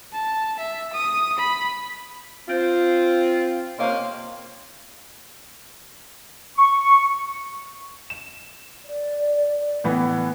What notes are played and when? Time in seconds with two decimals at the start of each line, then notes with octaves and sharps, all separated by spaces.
0.13 A5
0.59 E5
0.93 D#6
1.39 B5
2.49 C4 F4
3.79 C3 A#3 C#4 C5 D#5 F5
6.58 C#6
8.10 E7
8.85 D5
9.84 A2 E3 B3